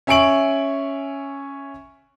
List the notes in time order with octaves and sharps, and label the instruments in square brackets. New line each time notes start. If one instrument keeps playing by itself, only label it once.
[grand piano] C#4 E5 G#5 C#6 D7 F#7